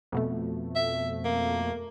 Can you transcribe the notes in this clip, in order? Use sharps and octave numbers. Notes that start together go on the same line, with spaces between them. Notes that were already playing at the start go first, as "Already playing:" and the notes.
F2 B2 A3
E5
A#3